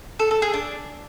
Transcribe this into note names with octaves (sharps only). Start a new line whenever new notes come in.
A4
A4
G#4
D4